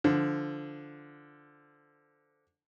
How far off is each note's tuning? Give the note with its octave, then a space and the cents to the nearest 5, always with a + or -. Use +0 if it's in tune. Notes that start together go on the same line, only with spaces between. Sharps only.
D3 +0 F3 -10